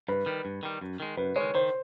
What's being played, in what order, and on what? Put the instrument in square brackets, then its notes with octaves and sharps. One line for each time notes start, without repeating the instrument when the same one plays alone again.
[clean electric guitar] G2 [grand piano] B4
[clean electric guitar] D#3 G3
G2
D#3 G3
F#2
D#3 G#3
[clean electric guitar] F#2 [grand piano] B4
[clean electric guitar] D#3 G#3 [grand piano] C#5
[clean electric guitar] D#3 [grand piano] C5